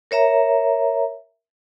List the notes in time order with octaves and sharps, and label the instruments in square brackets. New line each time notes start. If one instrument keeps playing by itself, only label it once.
[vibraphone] A#4 C#5 E5 A#5